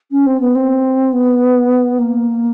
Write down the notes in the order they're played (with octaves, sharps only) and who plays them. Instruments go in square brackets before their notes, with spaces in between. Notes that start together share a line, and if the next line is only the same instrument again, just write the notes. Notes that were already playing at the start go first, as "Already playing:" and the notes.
[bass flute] C#4
C4
B3
C4
B3
A#3